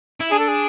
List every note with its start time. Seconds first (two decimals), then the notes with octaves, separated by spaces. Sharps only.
0.20 E4
0.31 D4 G#4
0.39 A4
0.48 G#4